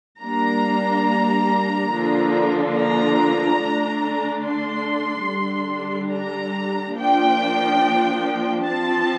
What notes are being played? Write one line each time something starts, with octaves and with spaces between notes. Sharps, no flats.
G3 A#3 D4 A#5
D3 F3 A#3 D4
A#5
D3 A3 D4
C6
D3 G3 D4
A#5
F3 A#3 D4 G5
F3 C4 A5